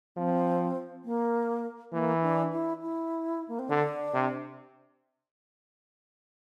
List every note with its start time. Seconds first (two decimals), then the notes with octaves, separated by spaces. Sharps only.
0.17 F3 C4
1.04 A#3
1.93 E3 A#3
2.22 D4
2.53 E4
2.82 E4
3.48 A#3
3.59 C4
3.69 D3 D4
4.14 C3